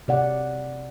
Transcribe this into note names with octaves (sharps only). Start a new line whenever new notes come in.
C3 D5 F#5